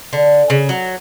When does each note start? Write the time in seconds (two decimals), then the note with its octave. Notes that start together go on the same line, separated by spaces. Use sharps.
0.13 D3
0.50 C#3
0.69 F#3